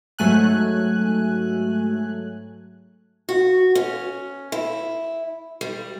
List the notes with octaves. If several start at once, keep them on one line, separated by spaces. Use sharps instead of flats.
G#2 F#3 A3 G#5 F#6
F#4
C#4
E4
G3